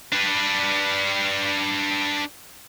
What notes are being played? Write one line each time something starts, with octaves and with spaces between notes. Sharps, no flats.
D4 B4